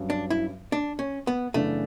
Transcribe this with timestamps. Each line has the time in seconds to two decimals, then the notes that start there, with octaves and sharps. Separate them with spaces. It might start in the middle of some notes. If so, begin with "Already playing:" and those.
Already playing: G2 F#3 C#4
0.10 D4
0.30 E4
0.72 D4
0.99 C#4
1.27 B3
1.54 F#2 C#3 E3 A3 B3 D4